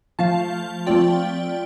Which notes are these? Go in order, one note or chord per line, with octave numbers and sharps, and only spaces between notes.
F3 A3 F4 F5 A5
F3 A3 C4 F4 D5 G5